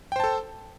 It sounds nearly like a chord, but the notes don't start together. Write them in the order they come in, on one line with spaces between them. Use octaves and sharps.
G5 C5 A5 A4